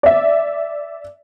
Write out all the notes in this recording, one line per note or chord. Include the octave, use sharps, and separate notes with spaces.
D5 E5